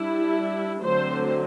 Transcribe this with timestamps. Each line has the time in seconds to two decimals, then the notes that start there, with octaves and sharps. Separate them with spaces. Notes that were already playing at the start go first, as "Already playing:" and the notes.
Already playing: G3 D4 E4
0.83 D3 F#3 A3 C4 C5